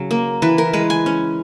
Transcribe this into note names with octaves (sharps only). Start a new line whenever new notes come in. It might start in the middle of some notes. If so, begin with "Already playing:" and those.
Already playing: C#3 F#3
A#3
E3 B4
A#4
G#3 B4
G#5
C#4